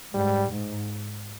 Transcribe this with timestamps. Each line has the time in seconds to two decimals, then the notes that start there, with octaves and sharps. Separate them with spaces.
0.14 G#2 G3
0.50 G#2